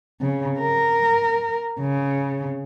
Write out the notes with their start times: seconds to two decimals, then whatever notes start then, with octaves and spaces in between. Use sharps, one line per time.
0.21 C#3
0.60 A#4
1.80 C#3